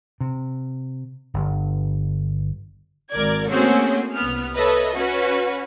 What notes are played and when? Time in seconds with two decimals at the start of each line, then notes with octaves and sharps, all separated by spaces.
0.20 C3
1.34 G1
3.11 G#1 A#4 D5 G#6
3.49 A3 A#3 C4 C#4 F#4 G#4
4.13 C2 B3 F6
4.57 A4 B4 C#5 D#5 E5
4.96 C#4 F#4 B4